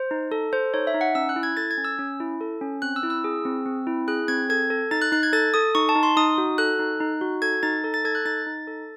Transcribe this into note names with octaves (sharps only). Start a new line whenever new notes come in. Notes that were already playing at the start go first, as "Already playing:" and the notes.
Already playing: C5
D#4
A4
A4 C5
D#4 C#5
E5
D#4
F#5
C#4 E6
F#6
E4
G#6
A4 A6
G#6
C#4
E6
C#4
E4
A4
C#4
C4 F#6
E6
E4
E6
G#4
C4
C4
E4
G#4 F#6
C4 G#6
A4 G#6
A4
D#4 A6
F#6
D#4 F#6
G#6
A4 A6
A4 D#6
D#4 C#6
A5
D#4
C6
D#4 D#6
F#4
A4 F#6
D#4
D#4
F#4
A4 G#6
D#4 A6
A4
A6
A4 G#6
F#6
D#4 A6
D#4
A4